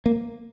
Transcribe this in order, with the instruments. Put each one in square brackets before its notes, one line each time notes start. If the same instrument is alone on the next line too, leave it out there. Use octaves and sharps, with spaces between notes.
[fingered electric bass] A#3